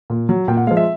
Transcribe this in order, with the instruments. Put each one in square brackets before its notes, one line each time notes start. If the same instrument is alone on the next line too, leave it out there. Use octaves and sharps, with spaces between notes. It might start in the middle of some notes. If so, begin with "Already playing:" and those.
[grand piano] A#2
F#3
A#2 G5
F#5
G#3 F5
F3
E5